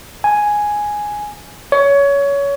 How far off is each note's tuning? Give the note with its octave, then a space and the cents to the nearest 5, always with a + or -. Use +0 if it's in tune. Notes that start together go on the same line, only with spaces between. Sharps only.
G#5 +0
C#5 +20